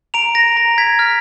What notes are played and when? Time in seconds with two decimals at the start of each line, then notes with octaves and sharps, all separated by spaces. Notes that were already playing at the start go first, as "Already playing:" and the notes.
0.14 A#5 D7 F7
0.35 A#6
0.57 A#5 A#6
0.78 G#6 B6
0.99 F6